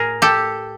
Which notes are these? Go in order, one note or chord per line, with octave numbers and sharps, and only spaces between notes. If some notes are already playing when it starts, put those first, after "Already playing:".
Already playing: A2 G#4 A#4
G4 A4